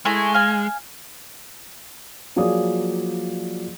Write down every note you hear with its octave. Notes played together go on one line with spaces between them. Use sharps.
G#3 A3 E4 G#5
F5 G#5
F3 F#3 A#3 G#4 D5 D#6